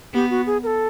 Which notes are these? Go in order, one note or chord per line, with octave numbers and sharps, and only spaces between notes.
B3 G4
F#4
G#4
A#4
A4